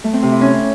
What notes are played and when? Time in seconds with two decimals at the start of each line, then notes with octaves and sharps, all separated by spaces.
0.04 A3
0.13 C4
0.23 C3
0.32 E4
0.41 C#4